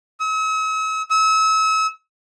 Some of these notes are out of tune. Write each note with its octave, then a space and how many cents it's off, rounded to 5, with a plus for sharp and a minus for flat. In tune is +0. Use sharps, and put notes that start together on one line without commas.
E6 -45
E6 -35